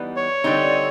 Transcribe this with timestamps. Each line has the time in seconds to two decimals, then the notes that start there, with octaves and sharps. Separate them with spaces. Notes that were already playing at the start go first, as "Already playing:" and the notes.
Already playing: E3 G3 B3 D#4
0.16 C#5
0.44 D3 G3 C4 D#4